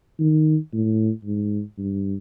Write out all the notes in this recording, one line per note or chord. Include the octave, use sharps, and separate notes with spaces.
D#3
A2
G#2
G2